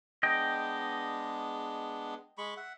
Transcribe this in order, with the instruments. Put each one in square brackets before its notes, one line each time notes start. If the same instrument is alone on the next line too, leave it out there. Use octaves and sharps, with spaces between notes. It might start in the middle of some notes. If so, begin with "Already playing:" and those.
[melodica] G#3 B3 D4 [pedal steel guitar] D#5 G5
[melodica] G#3 B5 C#6
E5 F#5